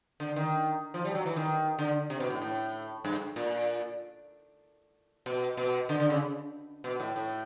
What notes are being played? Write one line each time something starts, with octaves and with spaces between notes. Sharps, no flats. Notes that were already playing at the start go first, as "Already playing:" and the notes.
D3
D#3
F3
G3
F#3
E3
D#3
D3
C3
B2
A2
A2
G2
A#2
B2
B2
D3
D3
C#3
B2
A2
A2